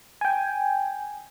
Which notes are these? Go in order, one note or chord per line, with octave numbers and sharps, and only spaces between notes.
G5 G#5